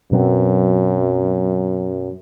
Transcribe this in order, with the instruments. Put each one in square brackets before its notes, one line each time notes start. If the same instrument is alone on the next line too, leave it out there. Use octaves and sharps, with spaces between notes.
[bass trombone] F#2 [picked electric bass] B2 F#3 C4